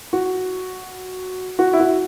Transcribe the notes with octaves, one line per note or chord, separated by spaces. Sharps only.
F#4
F#4
E4
F#4